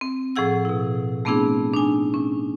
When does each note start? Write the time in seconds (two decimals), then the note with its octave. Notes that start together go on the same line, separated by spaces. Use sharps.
0.01 C4
0.36 A2 F3 G#4 F#5 E6
0.65 B2 E4
1.25 A3 B3 C4 D4 E4 G#4
1.74 D4 D#4 G#5
2.14 C#4